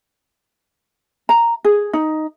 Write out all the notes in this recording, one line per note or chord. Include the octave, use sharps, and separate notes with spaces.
A#5
G#4
D#4